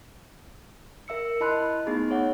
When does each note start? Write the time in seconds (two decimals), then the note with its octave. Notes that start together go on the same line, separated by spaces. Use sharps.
1.08 A#4 E5 E6 C#7
1.40 E4 D#5 A5 B5 C6 F#6
1.87 A3 B3 D#4 G#4
2.10 G#4 C#5 E5 F#5